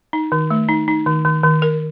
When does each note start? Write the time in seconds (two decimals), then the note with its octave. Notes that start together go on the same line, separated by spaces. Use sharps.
0.13 D#4
0.32 D#3
0.50 A3
0.69 D#4
0.88 D#4
1.06 D#3
1.25 D#3
1.43 D#3
1.62 A#4